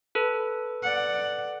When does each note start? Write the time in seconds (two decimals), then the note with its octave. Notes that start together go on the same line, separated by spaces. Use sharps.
0.15 A4 B4
0.83 D5 F#5